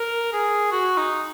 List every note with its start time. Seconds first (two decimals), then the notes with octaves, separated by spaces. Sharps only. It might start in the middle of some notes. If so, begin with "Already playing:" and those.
Already playing: A#4
0.33 G#4
0.72 F#4
0.97 D#4